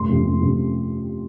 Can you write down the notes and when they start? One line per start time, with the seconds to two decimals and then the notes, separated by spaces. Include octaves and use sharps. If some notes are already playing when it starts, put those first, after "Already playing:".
Already playing: F1 C6
0.09 F2 C3 F3
0.24 F1
0.41 F2 C3 F3